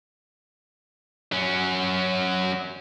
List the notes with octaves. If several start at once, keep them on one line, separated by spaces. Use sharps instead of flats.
F#3 C#4